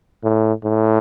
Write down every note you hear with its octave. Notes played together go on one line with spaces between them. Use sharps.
A2
A2